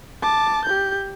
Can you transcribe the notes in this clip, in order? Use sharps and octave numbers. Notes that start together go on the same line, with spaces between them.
A5 D6
G4 G6